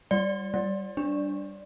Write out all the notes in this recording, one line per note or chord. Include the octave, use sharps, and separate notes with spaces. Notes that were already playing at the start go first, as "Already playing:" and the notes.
G3 D5
G3
D4